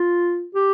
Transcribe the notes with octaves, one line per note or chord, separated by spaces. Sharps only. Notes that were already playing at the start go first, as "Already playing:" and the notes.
Already playing: F4
G4